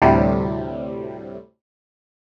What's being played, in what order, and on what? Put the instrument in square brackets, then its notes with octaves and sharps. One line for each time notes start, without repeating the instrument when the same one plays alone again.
[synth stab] D2 A2 C3 G3